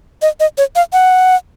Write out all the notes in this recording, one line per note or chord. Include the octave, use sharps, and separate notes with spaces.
D#5
D#5
C#5
F5
F#5